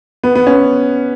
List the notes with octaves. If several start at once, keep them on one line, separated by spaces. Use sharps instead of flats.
B3
B3
C#4